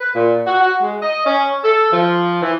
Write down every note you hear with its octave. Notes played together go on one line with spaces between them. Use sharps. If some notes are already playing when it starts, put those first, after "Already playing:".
B4
A#2
F#4
F#4
G#3
D#5
C#4
A4
F3
E3